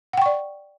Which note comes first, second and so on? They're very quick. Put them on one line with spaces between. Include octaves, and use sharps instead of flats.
F#5 G5 C#6 D5